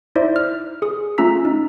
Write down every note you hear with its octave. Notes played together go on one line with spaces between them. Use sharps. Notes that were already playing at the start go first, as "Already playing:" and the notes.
D#4 E4 C5 D5 E5
F6
G#4 D#6
A3 C#4 F4 A#5 E6 B6
D#4